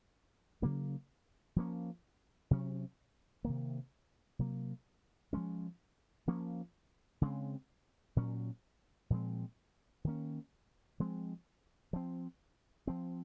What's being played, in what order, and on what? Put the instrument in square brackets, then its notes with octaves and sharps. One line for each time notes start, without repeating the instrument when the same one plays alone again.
[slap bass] C#3 F#3 A#3 C#4
F3 A#3 C#4
C3 F#3 C#4
C3 D#3 A#3
C3 F#3 A#3
F3 G#3 C#4
F3 A#3 C#4
C#3 G#3 C4
A#2 F#3 C#4
A#2 F3 G#3 C4
D#3 A#3 C#4
F3 G#3 C4
F3 C4
F3 C4